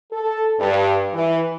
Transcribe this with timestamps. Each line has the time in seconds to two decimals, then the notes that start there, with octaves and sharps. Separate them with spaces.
0.13 A4
0.59 G2
1.14 E3